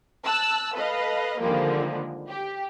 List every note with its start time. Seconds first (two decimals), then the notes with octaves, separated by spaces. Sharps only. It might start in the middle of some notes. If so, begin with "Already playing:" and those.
0.25 A5 E6 F#6
0.74 A4 B4 D#5 F5
1.40 D3 D#3 F3 G3 G#3 A#3
2.28 G4